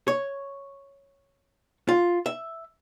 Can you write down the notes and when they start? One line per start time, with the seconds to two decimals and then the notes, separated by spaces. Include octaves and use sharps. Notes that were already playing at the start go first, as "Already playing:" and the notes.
0.08 C#5
1.89 F4
2.26 E5